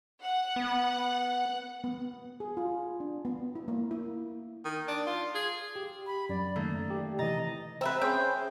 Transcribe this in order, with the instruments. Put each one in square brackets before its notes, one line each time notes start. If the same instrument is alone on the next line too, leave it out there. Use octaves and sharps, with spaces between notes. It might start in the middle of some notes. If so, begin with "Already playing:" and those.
[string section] F#5
[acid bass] B3
[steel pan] B3
G#4
F4
D4
B3
E4
A#3
E4
[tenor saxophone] D#3
D4
F4
G#4
[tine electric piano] G4
[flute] B5
[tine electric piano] F#2 [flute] D5
[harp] D#3 A3 A#3
[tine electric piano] G4
[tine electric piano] C3 E3 [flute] D#5 [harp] A#5 A6 A#6
[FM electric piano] C4 E6 [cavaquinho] B4 E5 A#5
[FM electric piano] C#4 G#4 C5 [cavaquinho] G5